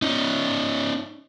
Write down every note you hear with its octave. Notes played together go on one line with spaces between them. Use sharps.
C#4 D#4